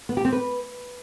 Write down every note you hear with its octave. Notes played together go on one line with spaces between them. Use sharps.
B3
G4
C4
B4